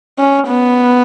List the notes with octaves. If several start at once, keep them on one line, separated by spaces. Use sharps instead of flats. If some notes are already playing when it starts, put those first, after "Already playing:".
C#4
B3